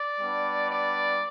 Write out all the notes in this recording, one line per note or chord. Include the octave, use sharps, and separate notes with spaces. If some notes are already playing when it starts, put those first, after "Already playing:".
Already playing: D5
G3 B3 D4
D5